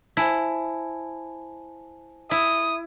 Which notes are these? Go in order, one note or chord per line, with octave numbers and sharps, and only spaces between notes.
E4 C5 G#5 A5
E4 D#6